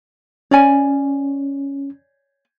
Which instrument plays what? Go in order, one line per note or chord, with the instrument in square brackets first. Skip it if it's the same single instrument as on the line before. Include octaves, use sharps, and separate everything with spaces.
[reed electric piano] C#4 [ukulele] C#5 D5 G#5